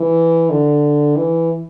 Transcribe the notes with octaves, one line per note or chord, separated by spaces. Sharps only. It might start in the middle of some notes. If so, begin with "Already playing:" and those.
Already playing: E3
D3
E3